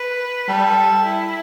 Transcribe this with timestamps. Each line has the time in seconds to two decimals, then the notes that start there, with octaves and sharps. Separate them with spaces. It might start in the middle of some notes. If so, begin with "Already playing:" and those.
Already playing: B4
0.48 G3 A4
1.04 E4